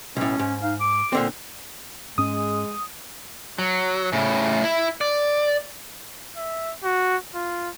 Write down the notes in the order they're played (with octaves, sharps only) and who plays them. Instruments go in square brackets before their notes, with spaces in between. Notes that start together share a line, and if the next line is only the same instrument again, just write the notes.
[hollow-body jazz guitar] B1 A2 [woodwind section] C#4
[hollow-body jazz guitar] G#2
[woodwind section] D#4 F5
D6
[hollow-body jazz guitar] A#2 D3 C4
[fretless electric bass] G#2 C#4 [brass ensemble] G#3 [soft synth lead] D#6
[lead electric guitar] F#3
A2 C#3
E4
D5
[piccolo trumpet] E5
F#4
F4